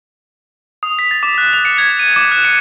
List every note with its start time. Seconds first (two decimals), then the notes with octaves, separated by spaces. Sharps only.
0.83 D#6
0.99 B6
1.11 A6
1.23 D6
1.38 F#6
1.53 F7
1.65 C#7
1.78 G#6
1.99 D#7
2.16 D6
2.32 F#6
2.44 C#7